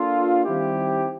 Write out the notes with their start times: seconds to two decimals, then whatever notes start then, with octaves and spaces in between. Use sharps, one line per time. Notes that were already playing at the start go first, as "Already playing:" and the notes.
Already playing: A#3 D4 F4 A4
0.44 D#3 G3 C4 E4 G4